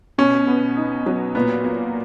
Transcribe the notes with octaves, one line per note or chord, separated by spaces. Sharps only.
B2 C#4
B3
D#4
F#3
A#2 B3
A#3